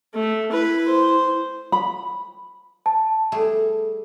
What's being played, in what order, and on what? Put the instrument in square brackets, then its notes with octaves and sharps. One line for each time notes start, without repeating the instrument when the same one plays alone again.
[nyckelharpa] A3
[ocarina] E4 [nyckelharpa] B4
[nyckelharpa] C5
[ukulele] B5
[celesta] A5
[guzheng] G3 A3 G#4